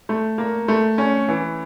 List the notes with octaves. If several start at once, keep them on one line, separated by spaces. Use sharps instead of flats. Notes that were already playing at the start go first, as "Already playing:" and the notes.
A3
A#3
A3
C#4
E3